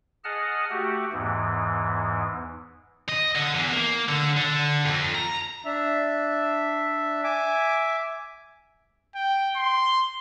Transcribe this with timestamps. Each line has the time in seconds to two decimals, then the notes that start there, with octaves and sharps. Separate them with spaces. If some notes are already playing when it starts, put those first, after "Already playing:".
0.24 G#4 D#5 F#5 A5 F6
0.71 A3 F#4 G4
1.13 E2 G#2 E3
3.09 D#5
3.35 D3
3.54 E2
3.72 A#3
4.08 D3
4.37 D3
4.86 F2
5.15 A#5
5.65 D4 E5
7.24 E5 G#5 D6
9.15 G5
9.56 C6